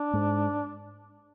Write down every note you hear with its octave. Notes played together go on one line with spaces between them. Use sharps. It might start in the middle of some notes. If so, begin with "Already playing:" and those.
Already playing: D4
G#2